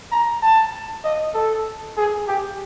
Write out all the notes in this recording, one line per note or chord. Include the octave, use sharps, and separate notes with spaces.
A#5
A5
D#5
A4
G#4
G4